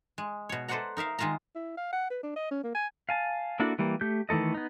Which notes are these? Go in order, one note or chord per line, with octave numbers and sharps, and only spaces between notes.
G#3
B2 C#5
A4 B4 C5 D5 F#5 A#5
D#4 A#4 E5 F5
D#3 G#3 F4 E5 A#5
E4
F5
F#5
B4
D4
D#5
C#4
A#3
G#5
F5 G#5 A5
A#3 D4 E4 F#4 A4
E3 G3 A#3
A3 G4 G6
D#3 E3 A3 A4 D#5
B3 D#4